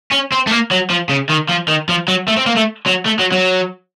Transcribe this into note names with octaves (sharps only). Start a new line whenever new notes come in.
C#4
C4
A3
A#3
F#3
F3
C#3
D#3
F3
D#3
F3
F#3
A3
C4
A#3
A3
F#3
A3
F#3
F#3